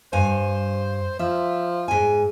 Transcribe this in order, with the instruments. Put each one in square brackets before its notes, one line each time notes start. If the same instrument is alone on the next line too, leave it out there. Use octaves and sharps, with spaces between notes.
[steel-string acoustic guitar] G2 F5 G#5 [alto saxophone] C5
[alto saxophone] F3 [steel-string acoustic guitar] E5
[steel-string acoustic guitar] G#2 G#5